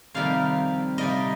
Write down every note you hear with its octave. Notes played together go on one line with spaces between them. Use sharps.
F2 C3 D#3 G3 A#3 F5
C3 G3 A#3 D#5